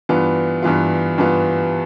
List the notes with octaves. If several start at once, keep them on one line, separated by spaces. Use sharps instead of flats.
G2 E3 B3 F4
G2 E3 B3 F4
G2 E3 B3 F4